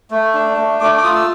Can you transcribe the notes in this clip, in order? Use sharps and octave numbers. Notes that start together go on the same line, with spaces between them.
A3
D4
A3
A3 D6
D6
F4 D#6
E6